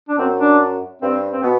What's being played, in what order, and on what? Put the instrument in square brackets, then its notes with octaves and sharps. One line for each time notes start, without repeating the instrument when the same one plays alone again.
[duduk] D4
[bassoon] F#2 [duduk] C4
[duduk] D4
[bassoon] G2 [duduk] C4
[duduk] C4
[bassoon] B2 [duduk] B3